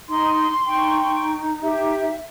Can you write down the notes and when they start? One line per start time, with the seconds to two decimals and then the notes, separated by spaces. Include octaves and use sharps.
0.09 D#4 C6
0.67 D#4 G5 C#6
1.63 G4 E5